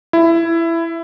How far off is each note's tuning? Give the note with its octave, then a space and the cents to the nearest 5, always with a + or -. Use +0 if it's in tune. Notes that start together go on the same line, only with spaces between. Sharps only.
E4 +15